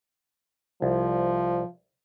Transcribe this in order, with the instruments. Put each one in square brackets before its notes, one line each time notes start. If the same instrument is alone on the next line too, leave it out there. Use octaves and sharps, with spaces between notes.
[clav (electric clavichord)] C2 [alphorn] F3